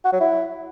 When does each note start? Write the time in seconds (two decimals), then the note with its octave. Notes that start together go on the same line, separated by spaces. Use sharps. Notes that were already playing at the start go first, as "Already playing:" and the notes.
0.05 F#4
0.12 F#3
0.20 E4